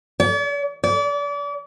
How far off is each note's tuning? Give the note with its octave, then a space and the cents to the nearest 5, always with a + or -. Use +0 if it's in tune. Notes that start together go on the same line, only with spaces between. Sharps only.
D5 -45
D5 -35